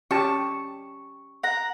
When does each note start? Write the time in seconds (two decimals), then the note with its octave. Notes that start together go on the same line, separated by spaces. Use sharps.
0.11 C#4 G4 A5 C#6
1.43 F#5 A#5